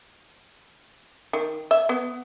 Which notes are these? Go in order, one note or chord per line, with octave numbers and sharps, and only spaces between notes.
D#3
E5
B3